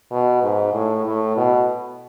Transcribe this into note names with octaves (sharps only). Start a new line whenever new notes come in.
B2
G#2
A2
A2
B2